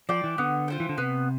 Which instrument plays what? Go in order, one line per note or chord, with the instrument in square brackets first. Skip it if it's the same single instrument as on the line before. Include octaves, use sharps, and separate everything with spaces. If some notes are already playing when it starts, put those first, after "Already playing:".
[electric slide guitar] F3 [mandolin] D5 G5
[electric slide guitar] E3
[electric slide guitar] D3 [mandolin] B3
[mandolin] F4 C5 G5
[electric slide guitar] E3
D3
[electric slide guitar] C3 [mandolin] B3